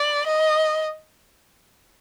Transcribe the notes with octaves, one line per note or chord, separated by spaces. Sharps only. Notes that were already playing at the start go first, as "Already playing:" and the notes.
Already playing: D5
D#5